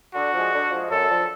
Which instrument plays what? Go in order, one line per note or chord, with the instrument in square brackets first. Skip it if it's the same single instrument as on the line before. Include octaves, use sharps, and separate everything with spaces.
[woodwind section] D3 [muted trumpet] F#4
[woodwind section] F3 G#3
D3
F3 G#3
[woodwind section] F#2 [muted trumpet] A4
[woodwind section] D3 F3